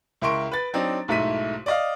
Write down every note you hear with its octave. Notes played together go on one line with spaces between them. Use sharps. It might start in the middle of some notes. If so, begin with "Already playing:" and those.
C#2 E4 A#4 C6 C#6 D7
B4 A6
F#3 C4 D4 D#4
B1 G#2 A3 E4 B6 D#7
D5 D#5 F5